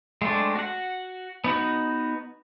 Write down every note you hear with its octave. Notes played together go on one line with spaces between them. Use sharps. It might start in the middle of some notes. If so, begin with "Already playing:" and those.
G#3 A3 C4 D4
F#4 F#5
B3 D#4 F#4